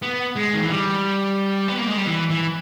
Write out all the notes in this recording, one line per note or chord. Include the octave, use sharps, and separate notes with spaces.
B3
G#3
D#3
E3
G3
B3
A#3
G#3
G3
E3
E3